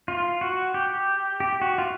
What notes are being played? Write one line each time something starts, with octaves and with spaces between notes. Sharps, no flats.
F4
F#4
G4
G4
F#4
F4